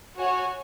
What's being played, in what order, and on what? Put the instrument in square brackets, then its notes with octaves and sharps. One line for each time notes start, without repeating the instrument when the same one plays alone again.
[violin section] F#4 C#5 G#5